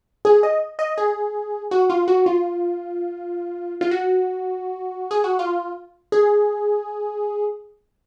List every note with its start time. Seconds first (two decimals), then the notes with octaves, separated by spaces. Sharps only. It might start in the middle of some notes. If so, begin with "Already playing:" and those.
0.25 G#4
0.43 D#5
0.79 D#5
0.98 G#4
1.71 F#4
1.90 F4
2.08 F#4
2.26 F4
3.81 F4
3.91 F#4
5.11 G#4
5.24 F#4
5.39 F4
6.12 G#4